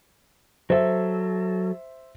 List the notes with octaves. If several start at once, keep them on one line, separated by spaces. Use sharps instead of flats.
F#3 A4 C5 E5